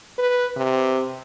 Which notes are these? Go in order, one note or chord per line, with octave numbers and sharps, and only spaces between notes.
B4
C3